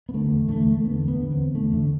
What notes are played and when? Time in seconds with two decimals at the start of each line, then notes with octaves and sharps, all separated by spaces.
0.09 B3
0.14 D3 A3
0.31 E2
0.49 D3 A3
0.67 E2
0.73 A3
0.84 D3 B3
1.02 E2
1.08 B3
1.20 D3
1.32 C4
1.37 E2
1.55 D3 A3
1.73 E2 D3